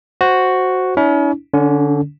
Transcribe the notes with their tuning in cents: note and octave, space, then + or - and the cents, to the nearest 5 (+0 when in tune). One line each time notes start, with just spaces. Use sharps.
F#4 +0 C5 +0
C#4 +40 E4 -40
D3 -5 C#4 +30